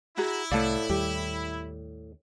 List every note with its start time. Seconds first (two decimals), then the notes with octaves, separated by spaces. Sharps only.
0.17 E4 F#4 G#4 A#5
0.52 C2 A2 A3 D5 F5 F#5 A5
0.90 D#2 G3 G4